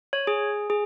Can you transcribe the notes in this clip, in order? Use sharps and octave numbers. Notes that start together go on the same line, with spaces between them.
C#5
G#4
G#4